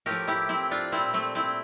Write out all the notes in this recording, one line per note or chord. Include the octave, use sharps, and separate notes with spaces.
A2 F3 A3 G4 A#4
E4 G4
C4 E4
D4 F4
A#2 G3 C4 E4
A3 C4
C4 E4